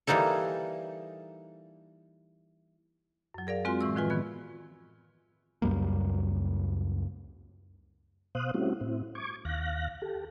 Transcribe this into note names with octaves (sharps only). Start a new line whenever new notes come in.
E3 G3 A#3 D#4 A4
F#2 F#3
G#4 A#4 D5 F5
G#3 C4 F4 F#4 G#5 C6
A2 E3 C#6 E6
A2 D#3 F3 F4 B4 G#5
D#3 B3 G#6
C#2 F#2 G3 A#3
B2 C5 F5 D#6 F#6
G3 A3 C4 C#4 E4 F#4
A2 C4 E4
C#6 D6 G#6
D#2 F5 F#6 A#6
G4 A4